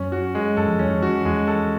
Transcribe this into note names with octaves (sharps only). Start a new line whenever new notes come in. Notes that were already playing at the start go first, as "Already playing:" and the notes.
Already playing: F#2 C#4
F#4
G#3
F#2 A4
F2
E2 C#4
F2
F#4
E2 G#3
A4